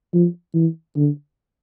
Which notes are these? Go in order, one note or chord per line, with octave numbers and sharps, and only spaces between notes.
F3
E3
D3